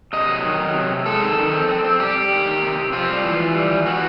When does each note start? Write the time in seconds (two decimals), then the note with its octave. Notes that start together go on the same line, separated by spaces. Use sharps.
0.13 C3 D#5
0.28 F#3
0.45 D#3
0.59 F#3
0.75 C3
0.90 C3
1.06 G#3 A4
1.21 D#3
1.38 D#3
1.53 C4
1.69 C4
1.84 C4
1.99 G3 G4
2.15 G3
2.31 D#3
2.46 D#3
2.62 C3
2.78 C3
2.93 C4 F4
3.09 G3
3.24 E3
3.39 E3
3.55 G3
3.70 E3
3.86 E3 F#4